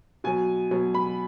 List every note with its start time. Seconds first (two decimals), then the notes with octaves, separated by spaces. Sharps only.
0.24 B2 F#3 G#5
0.71 B2 F#3
0.95 B5